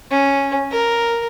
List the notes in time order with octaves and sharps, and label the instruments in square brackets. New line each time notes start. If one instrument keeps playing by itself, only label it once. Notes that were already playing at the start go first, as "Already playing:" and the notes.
[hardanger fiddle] C#4
A#4